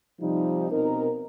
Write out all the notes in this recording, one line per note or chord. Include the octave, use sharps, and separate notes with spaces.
C3 F3 G3 D#4
B2 C4 D#4 A#4